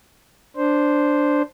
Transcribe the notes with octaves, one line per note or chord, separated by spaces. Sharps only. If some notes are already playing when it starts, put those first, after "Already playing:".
D4 C5